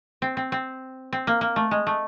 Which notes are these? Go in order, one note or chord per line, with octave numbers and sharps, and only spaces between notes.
C4
C4
C4
C4
A#3
A#3
A3
G#3
A3